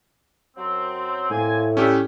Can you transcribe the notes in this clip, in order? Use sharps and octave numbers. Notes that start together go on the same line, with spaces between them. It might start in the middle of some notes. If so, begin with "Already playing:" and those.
F#2 F#3 C4
A2 A#3 C4 G#5
G3 A3 C#4 G4